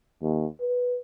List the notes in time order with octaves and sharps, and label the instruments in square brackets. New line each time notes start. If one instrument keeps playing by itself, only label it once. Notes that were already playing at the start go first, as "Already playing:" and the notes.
[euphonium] D#2
B4